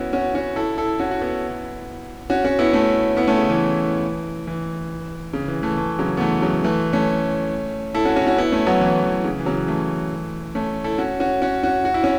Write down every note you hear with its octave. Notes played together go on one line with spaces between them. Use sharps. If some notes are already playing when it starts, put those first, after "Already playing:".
Already playing: B3 C#4 E4 F#4
C#4 F#4
C#4 F#4
E4 A4
E4 A4
C#4 F#4
F#4
B3 E4
C#4 F#4
C#4 F#4
B3 E4
A3 C#4
B3 E4
A3 C#4
C#3
E3
E3
C#3
E3
E3 A3
E3 A3
C#3 F#3
B3
E3 A3
C#3 F#3
E3 A3
A3 C#4
E4 A4
C#4 F#4
C#4 F#4
C#4 F#4
B3 E4
A3 C#4
F#3 B3
E3
E3
C#3
E3
C#3 F#3
E3 A3
A3 C#4
E4 A4
C#4 F#4
C#4 F#4
C#4 F#4
C#4 F#4
F#4
E4
C#4